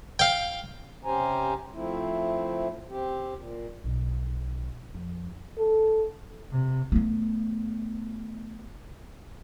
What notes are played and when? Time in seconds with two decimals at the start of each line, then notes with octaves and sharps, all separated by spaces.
0.19 F5 G5
1.05 C3 C#4 G4 C5 G#5 A#5
1.73 F3 A3 C4 E4
2.90 C4 G4
3.35 A#2
3.84 B1
4.94 F2
5.58 A4
6.51 C3
6.92 A3 B3